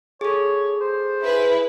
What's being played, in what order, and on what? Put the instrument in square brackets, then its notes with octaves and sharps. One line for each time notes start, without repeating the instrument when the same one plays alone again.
[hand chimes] G#4 A4 [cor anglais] C#5
[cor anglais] C5
[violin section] E4 G#4 B4